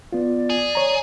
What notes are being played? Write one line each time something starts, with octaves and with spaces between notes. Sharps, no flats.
B3 F4 D5
G#4
C#5 A#5